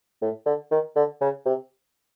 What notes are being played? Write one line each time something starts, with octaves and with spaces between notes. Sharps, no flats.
A2
D3
D#3
D3
C#3
C3